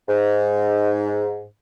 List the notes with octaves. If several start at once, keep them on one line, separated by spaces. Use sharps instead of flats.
G#2